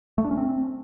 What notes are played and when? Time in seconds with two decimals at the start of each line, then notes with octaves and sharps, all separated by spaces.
0.18 A3
0.24 D4
0.31 C#4
0.37 C4